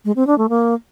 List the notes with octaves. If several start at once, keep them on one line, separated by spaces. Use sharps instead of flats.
G#3
C4
D4
A3
A#3